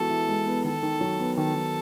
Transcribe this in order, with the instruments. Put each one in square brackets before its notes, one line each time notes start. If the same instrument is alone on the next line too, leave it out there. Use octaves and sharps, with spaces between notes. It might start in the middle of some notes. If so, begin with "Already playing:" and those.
Already playing: [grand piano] E3 G#3 B3 F#4 [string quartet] A4
[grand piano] E3
G#3
B3
[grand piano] D#3 [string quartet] A4
[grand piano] D#3
F#3
B3
[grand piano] D#3 [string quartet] A4
[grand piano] D#3